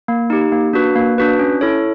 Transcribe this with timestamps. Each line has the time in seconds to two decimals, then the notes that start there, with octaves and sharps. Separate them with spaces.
0.08 A#3
0.30 D#4 G4
0.52 A#3
0.73 D4 F#4 B4
0.95 A#3
1.18 D4 F#4 B4
1.39 C#4
1.61 E4 A4 C#5